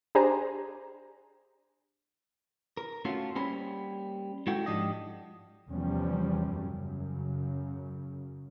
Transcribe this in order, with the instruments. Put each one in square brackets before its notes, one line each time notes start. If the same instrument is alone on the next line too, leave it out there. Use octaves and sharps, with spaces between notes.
[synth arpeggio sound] D4 G4 G#4 C5 A#5
[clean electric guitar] A#4
A3 C#4 F4 F#4 A4
G3 A#3 C#4 C5 G#5 B5
G#3 E4 F#4 A4 F#5 G5
G#2 F3 D4 G4 D#5
[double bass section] E2 C3 F3 G3 C#4
F#2 C#3